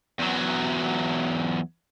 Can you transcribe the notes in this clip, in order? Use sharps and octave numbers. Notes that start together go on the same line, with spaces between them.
E2 F#3